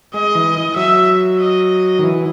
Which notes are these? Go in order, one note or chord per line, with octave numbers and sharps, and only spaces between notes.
G#3 D#5
E3
F#3 E5
D#5
D#3
E3